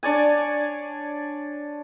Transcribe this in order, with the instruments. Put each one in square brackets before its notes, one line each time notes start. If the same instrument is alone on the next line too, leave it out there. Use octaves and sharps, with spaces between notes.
[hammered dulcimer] D4 C#5 D5 G#5